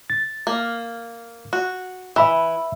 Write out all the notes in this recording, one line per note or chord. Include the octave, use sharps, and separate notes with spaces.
A6
A#3
F#4
E3 E5 B5 E6